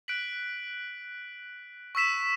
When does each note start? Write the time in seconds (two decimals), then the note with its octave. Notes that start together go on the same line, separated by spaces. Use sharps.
0.08 F#6 B6 D7 F#7
1.95 C#6 E6 B6 E7